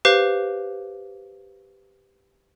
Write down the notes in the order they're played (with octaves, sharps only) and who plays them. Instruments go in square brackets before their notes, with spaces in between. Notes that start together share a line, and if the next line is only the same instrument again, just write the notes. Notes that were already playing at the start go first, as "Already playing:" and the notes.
[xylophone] G4 B4 C5 F5